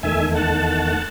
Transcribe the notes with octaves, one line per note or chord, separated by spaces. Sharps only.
E2 D#3 A3 E5 G#5
F#5 A5